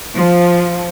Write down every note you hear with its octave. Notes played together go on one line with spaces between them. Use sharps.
F3